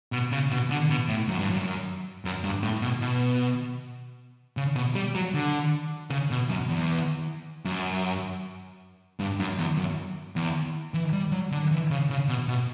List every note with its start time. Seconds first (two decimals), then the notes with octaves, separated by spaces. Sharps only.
0.12 B2
0.32 C#3
0.51 B2
0.70 D3
0.90 B2
1.08 A2
1.28 F#2
1.39 G2
1.50 F#2
2.25 F#2
2.44 G2
2.63 A2
2.82 B2
3.02 B2
4.57 C#3
4.76 B2
4.95 G3
5.15 F#3
5.34 D3
6.10 C#3
6.31 B2
6.49 F#2
6.69 E2
7.65 F#2
9.19 G2
9.40 F#2
9.58 E2
9.77 F#2
10.36 E2
10.94 E3
11.13 G3
11.32 F#3
11.52 D3
11.71 E3
11.90 C#3
12.10 C#3
12.28 B2
12.48 B2